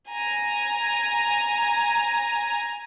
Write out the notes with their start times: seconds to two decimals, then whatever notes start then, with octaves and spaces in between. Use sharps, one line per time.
0.11 G#5 A#5